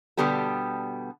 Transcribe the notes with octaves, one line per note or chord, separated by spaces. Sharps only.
B2 D3 G3 B3 G4 A4